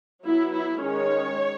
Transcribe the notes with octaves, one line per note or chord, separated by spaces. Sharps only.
F#3 B3 E4
E4
D#3 G#3 C#4 C#5